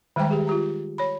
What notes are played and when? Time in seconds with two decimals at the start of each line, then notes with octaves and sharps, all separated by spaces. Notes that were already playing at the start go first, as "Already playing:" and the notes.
0.16 D#3 G3 G#3 C5 G5 A#5
0.30 G4 G#4
0.47 F4 G4 A#5
0.98 C#5 B5